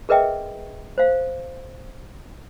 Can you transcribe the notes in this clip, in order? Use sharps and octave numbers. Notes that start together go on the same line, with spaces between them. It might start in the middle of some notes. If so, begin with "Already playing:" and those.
G#4 A#4 B4 D#5 E5 G5
C5 F5